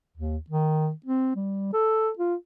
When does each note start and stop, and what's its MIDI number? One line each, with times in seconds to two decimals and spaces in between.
0.17 0.37 39
0.50 0.91 51
1.06 1.33 60
1.36 1.71 55
1.73 2.10 69
2.19 2.35 65